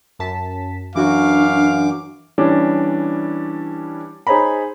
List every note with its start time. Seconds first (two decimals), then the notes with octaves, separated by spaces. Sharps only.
0.19 F#2 A5 B6
0.96 F#2 E3 D4 F#4 F5 C#6 D6
2.38 E3 G3 C#4 D4
4.27 D#4 G#4 C5 C#5 A#5 B5